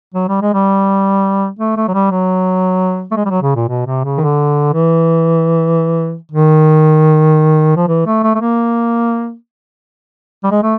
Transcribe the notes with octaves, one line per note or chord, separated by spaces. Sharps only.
F#3
G3
G#3
G3
A3
A3
F#3
G3
F#3
A3
G#3
G3
F#3
C#3
A#2
B2
C3
C#3
D#3
D3
E3
D#3
F3
E3
A3
A3
A3
A#3
G3
G#3
A3